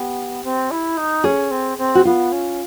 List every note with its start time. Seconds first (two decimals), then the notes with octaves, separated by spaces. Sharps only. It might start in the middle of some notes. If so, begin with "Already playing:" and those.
Already playing: B3 G4
0.43 C4
0.71 E4
0.97 D#4
1.24 C#4 G#4
1.51 C4
1.78 C4
1.95 F#4
2.05 B3 F4
2.32 C#4